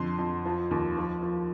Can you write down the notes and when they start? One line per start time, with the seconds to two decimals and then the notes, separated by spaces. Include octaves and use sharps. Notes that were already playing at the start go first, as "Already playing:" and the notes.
Already playing: F2 D3 C6
0.19 F2
0.46 F3
0.71 D#2
0.97 F3
1.22 F3